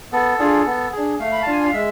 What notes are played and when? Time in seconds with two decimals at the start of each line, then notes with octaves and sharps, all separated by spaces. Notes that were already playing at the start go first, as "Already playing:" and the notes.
0.12 B3 A4
0.39 D4 F4 G#4
0.66 B3
0.92 D4 G#4
1.19 A3 F5
1.32 B5
1.42 D4 F4 A5
1.52 G#5
1.63 F5
1.73 G#3 E5